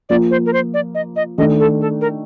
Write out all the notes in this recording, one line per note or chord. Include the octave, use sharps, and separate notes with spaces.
F3 A#3 F4 D5
C5
A#4
C5
D5
D#5
D#5
D#3 A3 D4 D#5
A4
A4
A#4